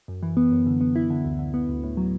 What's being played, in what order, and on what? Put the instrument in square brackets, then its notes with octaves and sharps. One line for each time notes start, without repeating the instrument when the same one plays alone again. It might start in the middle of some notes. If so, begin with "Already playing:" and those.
[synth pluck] F#2
E3
B3
F#2
D3
B3
E4
D3
D2
D3
B3
D2
A2
F#3